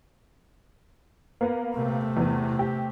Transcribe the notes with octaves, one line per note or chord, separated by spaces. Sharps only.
A#3 B3
C3 A3
E2 E3
G4